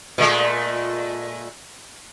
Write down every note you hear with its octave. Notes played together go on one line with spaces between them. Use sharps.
A#2 G#3 A3